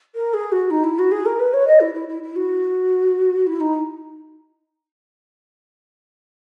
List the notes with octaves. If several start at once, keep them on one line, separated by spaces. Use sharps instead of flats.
A#4
G#4
F#4
D#4
E4
F#4
G#4
A#4
B4
C#5
D#5
E4
E4
E4
E4
F#4
E4
D#4